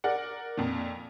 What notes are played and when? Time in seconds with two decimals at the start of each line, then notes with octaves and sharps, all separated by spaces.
0.04 A#4 D5 F#5
0.57 F2 A#2